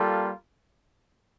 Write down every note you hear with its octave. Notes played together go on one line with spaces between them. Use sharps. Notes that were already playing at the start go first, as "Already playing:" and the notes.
Already playing: G3 A#3 F4 A4